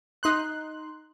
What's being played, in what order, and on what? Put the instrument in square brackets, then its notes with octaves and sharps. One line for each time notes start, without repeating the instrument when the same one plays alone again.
[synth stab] D#4 C6 F#6